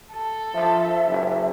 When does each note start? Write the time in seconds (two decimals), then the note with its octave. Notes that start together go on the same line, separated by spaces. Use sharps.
0.12 A4
0.54 F3 E5
1.06 F#1